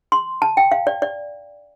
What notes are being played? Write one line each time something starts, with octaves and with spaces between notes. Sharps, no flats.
C6
A5
G5
F5
D5
D5